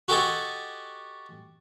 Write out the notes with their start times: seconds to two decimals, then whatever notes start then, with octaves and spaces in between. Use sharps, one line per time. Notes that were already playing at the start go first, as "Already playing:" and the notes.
0.08 F#4 G4 A4 D#5 G#5 A5